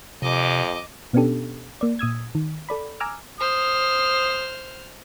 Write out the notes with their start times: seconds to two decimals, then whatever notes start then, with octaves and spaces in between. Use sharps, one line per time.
0.22 F2 C3 D#5 D6
1.13 B2 B3 C#4 D4 G4 A4
1.81 A#3 D5
1.99 A#2 D#6 E6 G#6
2.35 D#3
2.69 A4 D5 B5
3.00 G#5 A#5 D6 E6 F6
3.40 C5 D#6 F6